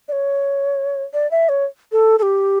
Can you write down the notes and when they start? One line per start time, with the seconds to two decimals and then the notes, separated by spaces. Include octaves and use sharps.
0.08 D5
0.12 C#5
1.13 D5
1.31 E5
1.49 C#5
1.92 A4
2.19 A4
2.23 G4